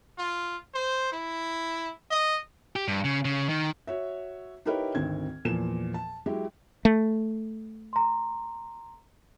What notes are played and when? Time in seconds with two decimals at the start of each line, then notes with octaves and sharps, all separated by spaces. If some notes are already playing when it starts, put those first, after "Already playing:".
0.18 F4
0.74 C5
1.12 E4
2.10 D#5
2.76 G4
2.88 G2
3.04 C#3
3.25 C#3
3.49 D#3
3.87 F#4 C#5 E5
4.66 D#4 E4 G4 A#4 B4 C#5
4.95 G#1 D2 D#3 C4 G#6
5.45 E2 A#2 F3 E7
5.94 A5
6.26 F#3 G#3 E4 G4
6.85 A3
7.93 A#5 C6